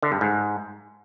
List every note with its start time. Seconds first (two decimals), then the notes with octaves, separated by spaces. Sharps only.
0.02 D3
0.12 G2
0.21 G#2